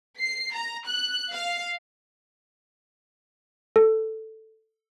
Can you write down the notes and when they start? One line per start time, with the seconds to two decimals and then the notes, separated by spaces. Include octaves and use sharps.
0.20 C7
0.54 A#5
0.86 F#6
1.33 F5
3.76 A4